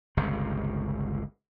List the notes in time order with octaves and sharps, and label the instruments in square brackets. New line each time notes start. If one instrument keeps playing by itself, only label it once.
[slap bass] G1 C#2 C3